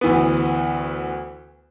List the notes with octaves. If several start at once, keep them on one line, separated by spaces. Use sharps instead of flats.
D2 E3 B3